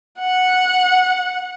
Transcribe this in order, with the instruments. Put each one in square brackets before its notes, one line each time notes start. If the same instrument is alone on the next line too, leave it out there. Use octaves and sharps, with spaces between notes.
[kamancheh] F#5